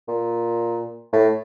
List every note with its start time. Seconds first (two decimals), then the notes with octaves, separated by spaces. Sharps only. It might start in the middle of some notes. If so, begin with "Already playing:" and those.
0.08 A#2
1.13 A2